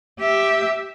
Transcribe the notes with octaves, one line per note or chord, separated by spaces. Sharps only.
G4 E5